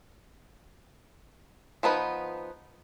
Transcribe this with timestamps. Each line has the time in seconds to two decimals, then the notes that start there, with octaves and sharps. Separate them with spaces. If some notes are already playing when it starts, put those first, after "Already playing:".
1.83 F3 B3 D#4 B4